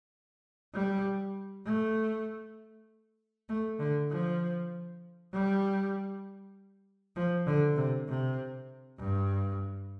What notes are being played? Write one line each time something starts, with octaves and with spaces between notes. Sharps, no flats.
G3
A3
A3
D3
F3
G3
F3
D3
C3
C3
G2